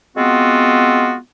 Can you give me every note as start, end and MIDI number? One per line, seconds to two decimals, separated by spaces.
0.17 1.16 56
0.17 1.16 59
0.17 1.16 60
0.17 1.16 65
0.17 1.16 66